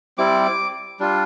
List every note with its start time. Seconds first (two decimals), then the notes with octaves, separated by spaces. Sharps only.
0.18 G3 C4 E4 D6
1.00 G3 D4 F4